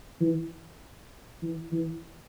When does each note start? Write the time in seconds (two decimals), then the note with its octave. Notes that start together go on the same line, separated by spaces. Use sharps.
0.21 E3
1.42 E3
1.72 E3